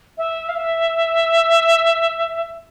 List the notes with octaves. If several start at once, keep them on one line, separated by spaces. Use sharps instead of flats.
E5
F5
E5